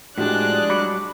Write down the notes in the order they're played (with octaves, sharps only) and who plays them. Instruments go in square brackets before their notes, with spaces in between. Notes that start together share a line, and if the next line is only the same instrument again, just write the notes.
[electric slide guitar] A2 F3 [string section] G#3 D4 [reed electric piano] F#4 G4 [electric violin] F#6
[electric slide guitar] F#3 G3 F#4 [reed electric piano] B5 D6